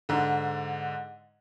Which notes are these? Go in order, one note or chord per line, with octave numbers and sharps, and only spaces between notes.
G#2 D3